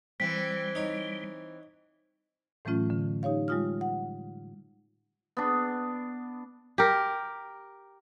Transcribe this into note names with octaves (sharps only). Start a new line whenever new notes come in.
E3 G3 C4 B6
D#4 C#5
A2 E3 F#3 A3 C#4 F4
D3
D#4 G4 C#5 F5
G3 G#3 F4 D#6 F6
F#5
B3 D4
G4 A#4